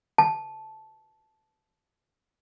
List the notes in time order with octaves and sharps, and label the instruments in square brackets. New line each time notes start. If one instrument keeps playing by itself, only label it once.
[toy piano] A5